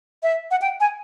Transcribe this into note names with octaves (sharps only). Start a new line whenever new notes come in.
E5
F#5
G5
G#5